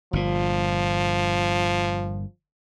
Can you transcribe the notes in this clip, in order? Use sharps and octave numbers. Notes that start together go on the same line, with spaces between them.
G1 A#2 F3